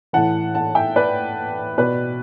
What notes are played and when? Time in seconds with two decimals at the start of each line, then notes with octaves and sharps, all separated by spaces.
0.13 A2 E3 F#5 A5
0.55 F#5 A5
0.75 E5 G5
0.96 B4 D5
1.78 B2 B4 D5